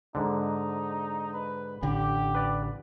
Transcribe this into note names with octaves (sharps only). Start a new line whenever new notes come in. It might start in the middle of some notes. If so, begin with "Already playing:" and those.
G#2 D3 D#4
B4
A1 D3 G4
B4 D5